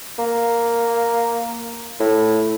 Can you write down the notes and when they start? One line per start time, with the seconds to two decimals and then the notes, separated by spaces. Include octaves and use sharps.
0.19 A#3
2.00 A2